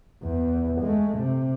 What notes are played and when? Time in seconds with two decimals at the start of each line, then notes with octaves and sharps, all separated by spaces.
0.23 E2
0.81 G#3 A3
1.18 C3